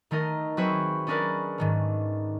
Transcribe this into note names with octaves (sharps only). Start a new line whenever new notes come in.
D#3 A3 D#4 A#4 D#5
F#3 C4 G#4 B4 C#5 E5
C#4 D4 G#4 A#4 B4 D5
G#2 D#3 A3